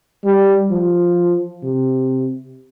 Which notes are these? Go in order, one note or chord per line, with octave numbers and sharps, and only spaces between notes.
G3
F3
C3